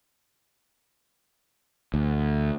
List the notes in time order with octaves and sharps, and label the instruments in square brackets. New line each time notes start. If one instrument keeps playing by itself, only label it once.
[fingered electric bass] D2